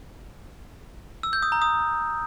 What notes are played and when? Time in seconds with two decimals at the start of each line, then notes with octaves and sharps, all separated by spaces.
1.23 E6
1.33 G6
1.42 D#6
1.52 A#5
1.62 D#6